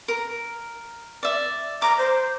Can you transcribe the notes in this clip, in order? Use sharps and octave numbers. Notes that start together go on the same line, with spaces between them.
A#4
D5 E5
A#5 D6
C5